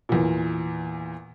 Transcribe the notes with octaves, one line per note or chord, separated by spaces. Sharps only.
E2 A#2